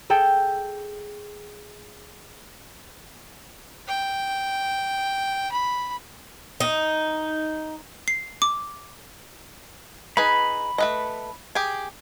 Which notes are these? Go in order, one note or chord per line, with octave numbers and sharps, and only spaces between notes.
G#4 A4 G5
G5
B5
D#4
C7
D6
D#4 G#4 B4 B5
A3 B4 D#5
G4 G#4